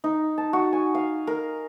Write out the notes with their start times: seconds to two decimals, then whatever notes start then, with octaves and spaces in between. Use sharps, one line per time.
0.04 D#4
0.38 A5
0.53 F#4
0.73 G#5
0.95 F5
1.27 A#4